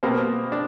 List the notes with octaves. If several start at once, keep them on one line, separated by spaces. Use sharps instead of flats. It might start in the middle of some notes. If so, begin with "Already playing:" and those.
B2 A#3 C4
D4